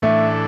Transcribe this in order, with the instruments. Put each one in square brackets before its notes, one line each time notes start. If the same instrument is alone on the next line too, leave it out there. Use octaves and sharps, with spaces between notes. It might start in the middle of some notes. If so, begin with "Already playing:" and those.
[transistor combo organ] A2 E3 D4 A4 [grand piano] A3